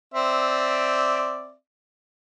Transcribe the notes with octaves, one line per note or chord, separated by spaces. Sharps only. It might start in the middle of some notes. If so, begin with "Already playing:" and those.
C4 D5 E5